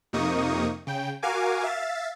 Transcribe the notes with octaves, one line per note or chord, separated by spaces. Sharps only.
F2 C3 A#3 D#4 C#6 D#6
C#3 G5
F#4 A#4 F5 G#5 D6
E5 F5 A6